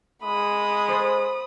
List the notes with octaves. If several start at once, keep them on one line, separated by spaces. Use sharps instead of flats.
G#3 B5 D#6
C5 A6